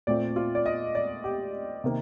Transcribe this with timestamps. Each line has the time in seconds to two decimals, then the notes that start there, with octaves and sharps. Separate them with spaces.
0.07 A#2 A3 C4 F4 D5
0.36 F4
0.55 D5
0.66 D#5
0.95 D5
1.24 G4
1.84 C3 D#3 A#3